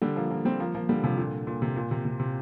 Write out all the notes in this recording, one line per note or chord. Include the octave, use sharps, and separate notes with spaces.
D3 G3
F3 A#3
F3 A#3
G3 C4
F3 A#3
F3 A#3
D3 G3
C3 F3
A#2 D3
A#2
C3
A#2
C3
C3
C3